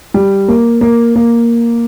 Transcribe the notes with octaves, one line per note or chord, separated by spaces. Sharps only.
G3
A#3
A#3
A#3